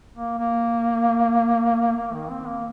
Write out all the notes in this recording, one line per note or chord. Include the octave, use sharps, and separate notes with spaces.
A#3
A#3
A#3
D#3
C4
A#3